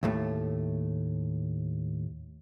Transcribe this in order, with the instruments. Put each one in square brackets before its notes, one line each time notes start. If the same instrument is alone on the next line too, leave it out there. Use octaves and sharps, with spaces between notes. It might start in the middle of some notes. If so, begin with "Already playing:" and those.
[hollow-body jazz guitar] D#2 A2 A3